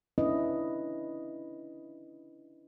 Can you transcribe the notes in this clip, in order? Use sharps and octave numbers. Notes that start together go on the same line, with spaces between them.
C#4 D4 E4 B4 D#5